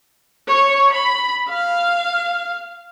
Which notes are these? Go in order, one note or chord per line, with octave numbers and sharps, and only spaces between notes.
C#5
B5
F5